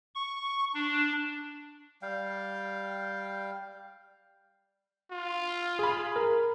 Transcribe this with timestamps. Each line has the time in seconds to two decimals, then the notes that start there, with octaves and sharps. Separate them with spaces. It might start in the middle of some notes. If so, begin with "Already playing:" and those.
0.15 C#6
0.74 D4
2.02 G3 F5 G5
5.12 F4
5.79 G#4 B5
6.16 A#4